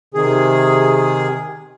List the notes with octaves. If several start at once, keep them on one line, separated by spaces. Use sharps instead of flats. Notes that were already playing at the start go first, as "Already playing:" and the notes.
C3 D#3 G#4